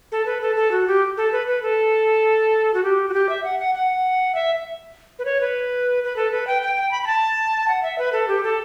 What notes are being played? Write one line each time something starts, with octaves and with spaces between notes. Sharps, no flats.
A4
B4
A4
A4
F#4
G4
A4
B4
B4
A4
F#4
G4
F#4
G4
E5
F#5
F#5
F#5
E5
B4
C#5
B4
B4
A4
B4
G5
G5
G5
B5
B5
A5
F#5
E5
B4
A4
G4
A4